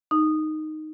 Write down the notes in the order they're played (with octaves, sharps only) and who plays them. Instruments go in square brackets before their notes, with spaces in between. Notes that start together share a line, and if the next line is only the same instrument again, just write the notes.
[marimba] D#4